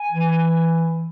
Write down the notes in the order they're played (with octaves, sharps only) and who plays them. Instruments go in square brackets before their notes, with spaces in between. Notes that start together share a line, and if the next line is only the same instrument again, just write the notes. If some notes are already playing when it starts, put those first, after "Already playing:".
Already playing: [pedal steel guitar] G#5
[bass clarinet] E3